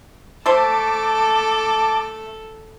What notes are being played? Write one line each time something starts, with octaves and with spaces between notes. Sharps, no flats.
A3 A4 C5 A5 D6